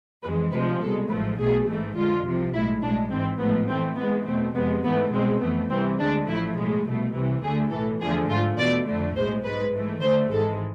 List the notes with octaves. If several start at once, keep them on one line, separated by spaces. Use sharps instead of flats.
F2 E3 G#3 B4
D2 C3 F3 G#3 B4
C2 B2 G#3 A4
A1 G#2 F3 A3 B4
B1 B2 A3 G#4
A1 G#2 E3 A3
F2 D3 G#3 F4
C2 C3 F3
B1 A2 G#3 E4
B1 A2 G#3 D4
G#1 G#2 E3 C4
A1 G#2 F3 A3 B3
F2 E3 A3 C4
G#2 E3 G#3 B3
E2 B2 A3 C4
F2 C3 G#3 B3
G#2 E3 A3 B3
C2 B2 G#3 C4
F2 E3 A3 B3
C2 C3 E3 C4
D2 D3 G#3 D4
A1 A2 F3 A3 E4
B1 A2 G#3
C2 B2 A3
C2 C3 E3
D2 D3 A3 G#4
B1 A2 E3 A4
E2 D3 F3 A3 G#4
G#2 F3 A3 F4
E2 B2 A3 D5
F2 D3 A3
B1 A2 G#3 C5
G#2 G#3 B4
G#2 E3 A3
D2 D3 A3 C5
G#1 G#2 E3 G#3 A4